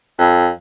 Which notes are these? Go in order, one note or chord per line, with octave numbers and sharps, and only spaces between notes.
F2